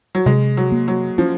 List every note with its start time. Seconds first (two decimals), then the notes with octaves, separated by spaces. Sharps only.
0.15 F#3
0.26 C3 G#3
0.57 F#3
0.72 A#3
0.88 F#3
1.18 F3 C#4